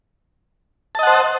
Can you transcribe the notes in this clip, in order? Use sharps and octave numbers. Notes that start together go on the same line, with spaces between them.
C5 D#5 F#5 A5